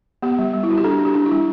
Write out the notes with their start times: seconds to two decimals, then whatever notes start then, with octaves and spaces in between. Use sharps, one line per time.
0.23 B3 G4
0.39 G3
0.54 G3
0.63 E4
0.69 G3 F#4
0.78 G4
0.84 D4 A4
0.99 D4
1.05 G4
1.15 D4
1.26 E4
1.31 G3